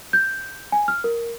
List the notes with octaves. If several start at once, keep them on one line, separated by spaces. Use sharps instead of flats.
G6
G#5
F6
A#4